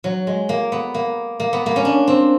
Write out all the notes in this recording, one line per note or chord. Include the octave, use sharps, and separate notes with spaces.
F#3
G#3
A#3
B3
A#3
A#3
B3
A#3
C#4
D4
C4